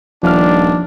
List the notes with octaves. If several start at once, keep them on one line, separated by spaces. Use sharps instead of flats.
D#1 F3 D4 F6